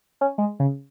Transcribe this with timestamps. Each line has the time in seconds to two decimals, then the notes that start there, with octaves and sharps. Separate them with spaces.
0.21 C#4
0.38 G#3
0.60 C#3